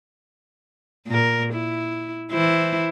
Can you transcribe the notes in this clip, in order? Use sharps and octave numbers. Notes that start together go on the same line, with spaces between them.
A#2 A#4
E4
E3 E4 C5